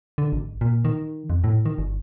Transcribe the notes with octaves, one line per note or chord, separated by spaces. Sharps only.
D3
G#1
A#2
D#3
F2
A2
D#3
G1